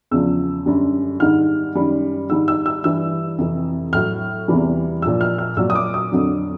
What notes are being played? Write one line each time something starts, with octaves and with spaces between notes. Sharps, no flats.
E2 C#3 F3 E6
F#2 D3 G3
G#2 D#3 G3 F6
F#2 D#3 G3
G#2 D#3 G3 E6
E6
E6
G2 E3 G3 E6
F2 C3 E3
A2 F#3 F6
E2 C3 E3 G3
A#2 F3 E6
F6
F6
A#2 F#3 E6
D#6
D6
D#6
F2 D3 F#3